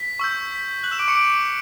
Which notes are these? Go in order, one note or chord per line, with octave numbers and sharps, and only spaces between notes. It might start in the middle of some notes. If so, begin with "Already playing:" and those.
Already playing: B6
C#6 E6 G6
B6
F#6 F#7
E6 E7
D6 D7
C#6 C#7
D6 D7